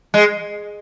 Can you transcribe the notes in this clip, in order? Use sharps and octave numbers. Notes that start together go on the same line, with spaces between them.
G#3